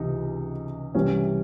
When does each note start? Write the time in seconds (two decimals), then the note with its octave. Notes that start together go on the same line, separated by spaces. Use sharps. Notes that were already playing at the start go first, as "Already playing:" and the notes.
Already playing: C#2 C3 E3 D#4
0.95 C2 C3 E3 C#4